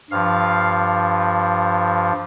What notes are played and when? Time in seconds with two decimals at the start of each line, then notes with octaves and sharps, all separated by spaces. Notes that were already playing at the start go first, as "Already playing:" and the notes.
0.11 G2 F3 F5